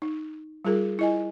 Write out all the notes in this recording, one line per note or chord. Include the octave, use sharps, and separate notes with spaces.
D#4
G3 F4 G#4 A#4
E4 D#5 G#5